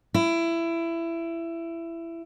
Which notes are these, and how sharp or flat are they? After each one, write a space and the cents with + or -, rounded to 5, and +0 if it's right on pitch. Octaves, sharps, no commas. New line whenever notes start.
E4 +20